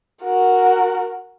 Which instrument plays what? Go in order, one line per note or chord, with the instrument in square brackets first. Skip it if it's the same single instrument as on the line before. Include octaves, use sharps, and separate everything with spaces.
[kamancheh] F#4 A#4